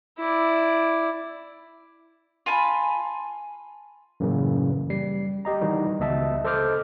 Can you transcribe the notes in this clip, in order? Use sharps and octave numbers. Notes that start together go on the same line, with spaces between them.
E4 D5
F4 G#5 A5 B5
F#2 A2 C#3 E3 A#3
G3 C7
G4 D#5 A#5
D#3 E3 G3 D#4 F#4
C#2 B3 D#5 E5 A5
A4 C5 D#5 D6 F6 G6